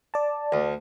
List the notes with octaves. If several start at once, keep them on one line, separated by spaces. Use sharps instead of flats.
D5 A5
D2